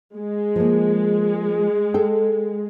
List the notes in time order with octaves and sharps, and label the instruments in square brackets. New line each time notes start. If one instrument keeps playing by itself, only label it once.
[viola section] G#3
[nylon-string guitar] F3 A#3
A4 G5